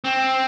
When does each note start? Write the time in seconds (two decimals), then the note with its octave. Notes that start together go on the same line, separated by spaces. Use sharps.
0.04 C4